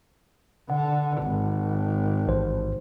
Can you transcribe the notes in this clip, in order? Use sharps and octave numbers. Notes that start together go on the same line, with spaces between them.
D3 F#5
G#1
A1 C5